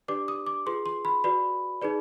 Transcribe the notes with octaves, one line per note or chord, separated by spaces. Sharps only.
D4 G4 B4 D5 D6
D#6
D6
F4 G#4 B4 C6
C6
B5
F#4 B4 D5 B5
D#4 G#4 B4 D5